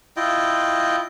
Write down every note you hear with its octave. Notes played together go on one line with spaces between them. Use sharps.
E4 F4 D#5 G5